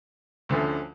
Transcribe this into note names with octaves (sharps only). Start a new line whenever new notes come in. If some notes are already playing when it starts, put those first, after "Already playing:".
D2 D3 F3 A3 C#4